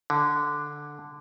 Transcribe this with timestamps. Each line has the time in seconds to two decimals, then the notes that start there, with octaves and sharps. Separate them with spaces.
0.10 D3